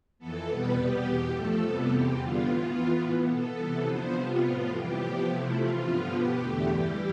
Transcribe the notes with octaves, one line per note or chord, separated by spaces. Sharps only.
F2 E3 B3 A4
E2 B2 G3 B3 B4
C3 G3 B3 G4
E2 B2 B3
G2 F3 A3 A4
F2 C3 G3 B3
E2 C3 E3 G4
E2 D3 G3 B3 F4
A2 E3 B3 F4
F2 E3 B3
A2 E3 B3
B2 B3 A4
C3 E3 G3 B3
F2 D3 F3 B3 C5
C3 G3 B3 F4
A2 F3 B3
F2 C3 E3 G3 G4
A2 F3 B3 G4
C3 F3 A3 E4
C3 E3 A3 F4
G2 D3 F3 B3
B2 B3 G4
E2 D3 A3 G4
G2 E3 G3